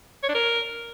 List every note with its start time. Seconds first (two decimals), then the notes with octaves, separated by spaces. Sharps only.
0.23 C#5
0.29 D4
0.35 A#4